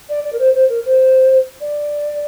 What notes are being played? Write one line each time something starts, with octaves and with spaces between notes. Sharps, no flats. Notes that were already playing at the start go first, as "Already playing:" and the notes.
D5
D5
A#4
C5
C5
A#4
C5
D5